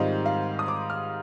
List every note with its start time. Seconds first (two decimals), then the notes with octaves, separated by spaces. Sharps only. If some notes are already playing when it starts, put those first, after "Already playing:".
Already playing: G#2 D#3 G3 C4 F4 D#5
0.26 F5
0.59 D#6
0.68 D6
0.90 F6